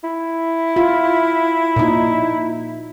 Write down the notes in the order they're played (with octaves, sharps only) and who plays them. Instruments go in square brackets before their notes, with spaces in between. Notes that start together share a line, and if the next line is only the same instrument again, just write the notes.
[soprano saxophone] E4
[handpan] F4
A#2 D#4